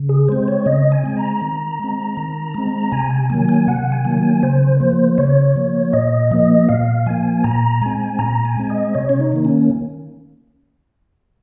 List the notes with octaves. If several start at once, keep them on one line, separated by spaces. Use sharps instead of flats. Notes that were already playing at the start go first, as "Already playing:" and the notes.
Already playing: C#3
G#4
G#3 C4 C5
C#5
C#3 D#5
G#5
G#3 C4
A#5
D#3
G#3 C4
D#3
G#3 C4
C3 G#5
G#5
D#3 F#3 A#3 G#5
G#5
C3 F#5
G#5
D#3 F#3 A#3
G#5
C#3 C5
F3 A#3 C5
C#3 C#5
F3 A#3
A#2 D#5
F3 A#3 D#5
A#2 F5
F3 A#3 G#5
A#2 A#5
G#3 C4 G#5
A#2 A#5
G#5
G#3 C4
D#5
C3 C#5
C#4
D#4
D#3 A#3
C#4